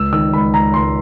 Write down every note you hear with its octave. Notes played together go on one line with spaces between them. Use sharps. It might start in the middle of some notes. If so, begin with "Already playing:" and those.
Already playing: C#2 E6
D#3 E6
C#2 B5
C#2 A#5
C#2 C6